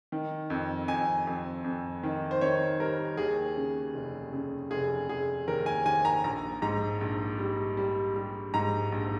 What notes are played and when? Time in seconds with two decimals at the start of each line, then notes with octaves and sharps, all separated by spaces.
0.12 D#3
0.50 F2
0.88 F2 G#5
1.27 F2
1.64 F2
2.03 D#3
2.31 C5
2.41 D#3 C#5
2.80 G3 A#4
3.17 D#2 G#4
3.57 C#3
3.94 F1
4.33 C#3
4.71 F1 G#4
5.09 F1 G#4
5.47 D#2 A#4
5.66 G#5
5.85 D#2 G#5
6.05 A#5
6.24 A#1 A#5
6.62 G#2 A#5
7.01 A#1
7.38 G3
7.77 G3
8.16 G3
8.54 G#2 A#5
8.92 A#1